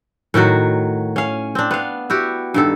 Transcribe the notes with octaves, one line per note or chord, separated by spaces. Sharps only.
A2 D#3 F#3 F#4
C#4 F5
C4 D4
B3 F5
E4 F#4 G4
G2 D#3 A4